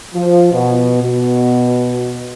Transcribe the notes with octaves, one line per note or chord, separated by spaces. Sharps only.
F3
B2
B2